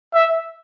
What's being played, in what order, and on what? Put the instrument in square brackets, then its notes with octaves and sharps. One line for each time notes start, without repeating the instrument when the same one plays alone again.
[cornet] E5